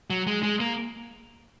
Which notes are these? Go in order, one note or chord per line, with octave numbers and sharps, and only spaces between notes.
F#3
G#3
G#3
A#3